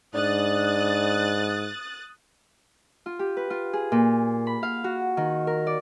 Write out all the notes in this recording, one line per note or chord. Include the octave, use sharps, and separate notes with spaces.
G#2 D4 D#6 F#6 A6
F4
G4
B4
F4
G#4
A#2
B5
F5
F#4
D#3
A#4
D5